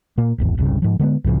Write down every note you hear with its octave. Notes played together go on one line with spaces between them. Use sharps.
A#2 A#3
D1 G#1 E2
E1 C2 G2 C#3
G#2 F3
D3 G#3 A3 B3
C2 A2 C#3 F3